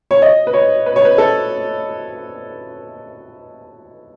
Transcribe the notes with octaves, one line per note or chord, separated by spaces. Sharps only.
C#5
D#5
B4
C#5
B4
C#5
B4
A4